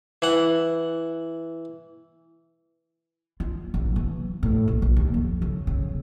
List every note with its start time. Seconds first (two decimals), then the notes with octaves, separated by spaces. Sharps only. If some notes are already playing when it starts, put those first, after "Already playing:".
0.22 E3 F#5
3.40 F4
3.74 A1
3.96 E3
4.43 A2
4.68 A#1
4.82 A#1
4.97 D#2
5.14 F2
5.42 C#3
5.67 C#3